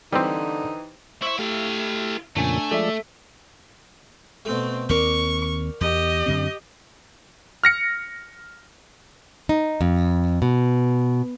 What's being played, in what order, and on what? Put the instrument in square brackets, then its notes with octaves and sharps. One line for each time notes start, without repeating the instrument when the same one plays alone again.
[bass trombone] D3 [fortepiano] E3 G4 C5 [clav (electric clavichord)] G3 C4 [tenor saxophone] D#4
[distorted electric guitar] E4 E5 [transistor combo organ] C5 C#6
[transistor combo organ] A3 G4 [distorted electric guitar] E4 F5
[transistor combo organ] F2 A#2 C#3 [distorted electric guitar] A3 [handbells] D4 G#5
[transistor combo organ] F3 G#3 D5 [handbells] A4 E5
[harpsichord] B2 A3 [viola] C4
[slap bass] D#2 C4 [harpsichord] A#4 D5 [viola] C#6
[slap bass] E2 [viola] G4 D#5
[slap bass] F#2 D3 C4
[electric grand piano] F6 A#6 C#7
[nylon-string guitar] D#4
F2
B2